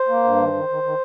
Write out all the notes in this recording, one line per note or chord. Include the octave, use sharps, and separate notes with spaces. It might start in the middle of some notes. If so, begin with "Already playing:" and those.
Already playing: C5
A#3
G2
D#3
D#3
D#3
D#3